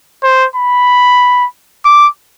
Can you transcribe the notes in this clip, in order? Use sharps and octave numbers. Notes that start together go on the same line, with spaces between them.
C5
B5
D6